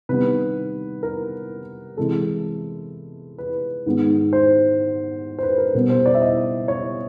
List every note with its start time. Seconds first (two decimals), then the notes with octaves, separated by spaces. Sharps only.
0.09 C3 D#3 G3 B3 B4
1.03 A#4
1.97 C3 E3 G#3 A4
3.38 B4
3.86 G#2 D#3 G#3 B3
4.33 C5
5.39 C5
5.43 B4
5.58 A#4
5.74 B2 G3 B3 A#4
5.90 C5
6.06 D5
6.14 E5
6.22 D#5
6.68 C#5